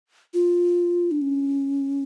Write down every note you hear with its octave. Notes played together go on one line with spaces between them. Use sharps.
F4
D4
C#4